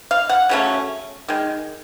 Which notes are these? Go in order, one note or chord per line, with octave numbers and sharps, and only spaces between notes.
F5
F#5
C#3 F#3 A3 C#4
D#3 G#3